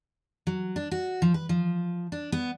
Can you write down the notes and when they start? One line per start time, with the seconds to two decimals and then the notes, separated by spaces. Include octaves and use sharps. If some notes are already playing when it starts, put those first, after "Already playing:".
0.47 F#3
0.76 D4
0.91 F#4
1.22 F3
1.34 B4
1.49 F3
2.12 D4
2.32 B3